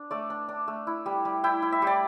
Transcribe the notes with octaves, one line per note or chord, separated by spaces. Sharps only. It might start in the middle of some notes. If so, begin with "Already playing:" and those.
Already playing: D4
A3 D5
D4
D4
A3
E4
G3
G3
E4 G5
E4
E5
G3 D5